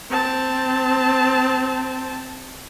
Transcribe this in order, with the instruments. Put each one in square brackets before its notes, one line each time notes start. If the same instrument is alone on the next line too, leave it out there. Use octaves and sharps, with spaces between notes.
[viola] C4 A5